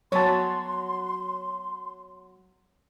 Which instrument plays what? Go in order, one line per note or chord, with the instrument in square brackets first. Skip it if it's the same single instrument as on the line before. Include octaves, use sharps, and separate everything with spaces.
[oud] F#3 B3 [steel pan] C#5 A5 [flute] C6